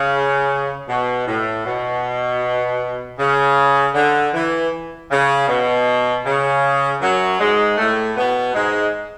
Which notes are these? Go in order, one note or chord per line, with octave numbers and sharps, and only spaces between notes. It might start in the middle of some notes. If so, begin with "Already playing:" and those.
Already playing: C#3
B2
A2
B2
C#3
D3
E3
C#3
B2
C#3
F#2 F#3
G#2 G#3
A2 A3
B2 B3
G#2 G#3